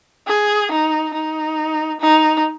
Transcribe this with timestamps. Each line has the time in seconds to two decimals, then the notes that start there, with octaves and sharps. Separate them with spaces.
0.28 G#4
0.71 D#4
1.14 D#4
2.00 D#4